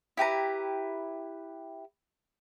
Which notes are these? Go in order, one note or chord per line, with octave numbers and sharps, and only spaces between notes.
E4 G4 B4 A#5